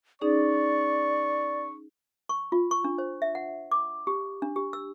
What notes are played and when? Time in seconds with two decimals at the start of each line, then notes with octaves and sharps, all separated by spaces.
0.21 C#4 D#4 G#4 D5 C#6
2.29 C#6
2.52 F4
2.71 C#6
2.84 D4
2.98 C5
3.22 E5
3.35 F#5
3.72 D6
4.07 G4
4.42 D4
4.56 G4
4.73 E6